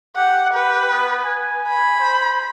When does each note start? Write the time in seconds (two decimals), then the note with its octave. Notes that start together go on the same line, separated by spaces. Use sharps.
0.17 G4 F#5
0.54 G4 B4
0.92 B3
1.24 G#5
1.68 B5
2.00 C5